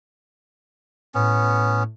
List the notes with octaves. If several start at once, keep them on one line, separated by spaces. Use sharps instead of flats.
A2 B3 C#4